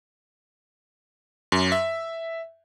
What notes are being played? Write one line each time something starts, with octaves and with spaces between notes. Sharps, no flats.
F#2
E5